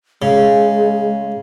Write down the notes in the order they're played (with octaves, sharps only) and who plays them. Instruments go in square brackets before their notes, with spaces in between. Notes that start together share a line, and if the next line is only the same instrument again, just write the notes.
[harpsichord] C#3 [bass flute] G#3